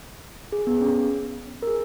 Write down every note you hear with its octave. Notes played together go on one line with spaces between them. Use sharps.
G#4
B3
C#4
A#4
G#4